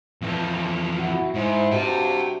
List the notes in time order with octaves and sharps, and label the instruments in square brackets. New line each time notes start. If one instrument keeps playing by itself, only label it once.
[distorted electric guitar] F2 E3
[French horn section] E4 F#4
[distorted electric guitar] G#2 [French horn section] D#4 E4 C5
[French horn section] G2 C3 F#4 [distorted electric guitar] G5 A5